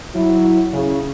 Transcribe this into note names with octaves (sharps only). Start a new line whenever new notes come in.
F#3 E4
C#3